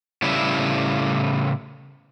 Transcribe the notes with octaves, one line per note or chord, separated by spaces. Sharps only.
A2 C#3 G3 E4 B4 E5